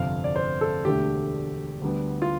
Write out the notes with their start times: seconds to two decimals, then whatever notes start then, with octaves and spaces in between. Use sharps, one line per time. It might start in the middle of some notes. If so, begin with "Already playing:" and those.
Already playing: G1 F2 C3 F5
0.24 D5
0.36 C5
0.61 A4
0.85 E1 D2 D3 A3 G4
1.82 D2 D3 G3 B3
2.22 F4